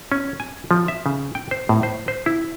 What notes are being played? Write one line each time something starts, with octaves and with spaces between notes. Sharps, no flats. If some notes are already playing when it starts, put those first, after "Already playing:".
C#4
G#5
F3
E5
C#3
G5
C5
A2
C5
C5
E4